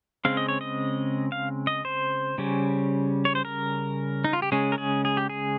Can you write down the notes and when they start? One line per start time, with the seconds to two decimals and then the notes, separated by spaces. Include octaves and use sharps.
0.25 C#3 G#3 C4 F5
0.37 D#5
0.49 C#5
0.61 D#5
1.32 F5
1.67 D#5
1.85 C5
2.38 C#3 G3 C#4
3.25 C#5
3.35 C5
3.45 A#4
4.24 D#4
4.33 F4
4.42 G4
4.52 C#3 G#3 C#4 G#4
4.72 A#4
4.78 G#4
5.05 G#4
5.17 G4
5.30 G#4